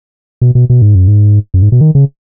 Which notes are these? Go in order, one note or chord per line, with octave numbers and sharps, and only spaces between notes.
B2
B2
B2
G#2
F#2
G#2
F#2
G#2
B2
D#3
C#3